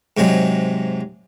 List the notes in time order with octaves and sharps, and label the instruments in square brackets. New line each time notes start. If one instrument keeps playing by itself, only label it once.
[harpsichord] G#2 C3 F#3 G#3